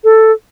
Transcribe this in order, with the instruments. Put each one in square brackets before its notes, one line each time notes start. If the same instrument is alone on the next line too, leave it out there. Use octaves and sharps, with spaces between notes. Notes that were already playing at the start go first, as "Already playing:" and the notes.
[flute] A4